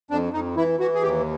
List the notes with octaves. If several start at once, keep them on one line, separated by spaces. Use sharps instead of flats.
F2 D4
F2 D#4
E3 E4
E3 F#4
G#4
D#2 G4